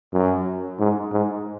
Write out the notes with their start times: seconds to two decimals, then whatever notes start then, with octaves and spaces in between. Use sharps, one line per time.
0.13 F#2
0.80 G#2
1.12 G#2